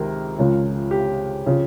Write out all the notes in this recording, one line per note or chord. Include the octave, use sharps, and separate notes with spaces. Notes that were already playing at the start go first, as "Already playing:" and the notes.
Already playing: C#2 C3 D#3 A#4
C#2 C#3 F3
G4
C#3 F3